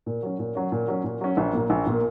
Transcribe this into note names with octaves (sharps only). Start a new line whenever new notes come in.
A#2
F#3 C#4
A#2
F#3 C#4
A#2
F#3 C#4
A#2
F#3 C#4
A#1
A#2 A#3
A#1
A#2 A#3